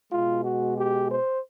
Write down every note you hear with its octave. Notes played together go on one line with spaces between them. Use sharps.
B2 G#3 F4
F#4
G4
C5